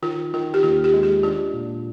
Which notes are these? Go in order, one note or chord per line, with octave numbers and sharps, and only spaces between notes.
D#3 F4
D#3 F4
G4
D#2 F4
G4
G#3
G4
D4 F4
A#2